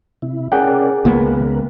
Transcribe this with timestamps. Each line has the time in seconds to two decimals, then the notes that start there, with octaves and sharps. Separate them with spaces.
0.22 C3 E4
0.52 C#4 G#4 A#4 D5 F#5 G5
1.05 C#2 A#3 B3 A#4 B4